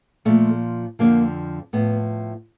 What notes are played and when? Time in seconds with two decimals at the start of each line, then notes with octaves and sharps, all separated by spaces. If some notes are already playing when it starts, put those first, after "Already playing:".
0.25 A#2 F3 A3
0.99 F2 D3 F3 A#3
1.73 A2 F3 B3